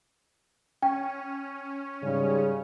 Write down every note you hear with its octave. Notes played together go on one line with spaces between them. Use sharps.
C#4 G5
G#2 C#3 G3